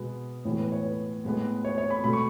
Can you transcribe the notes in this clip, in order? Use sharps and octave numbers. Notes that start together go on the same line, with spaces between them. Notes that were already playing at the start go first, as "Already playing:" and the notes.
Already playing: B2 G#3 B3
A2 E3 G#3 B3 C#5
B4
C#5
B4
A2 G#3 B3
C#5
C#5
B5
B2 A3 B5
C#6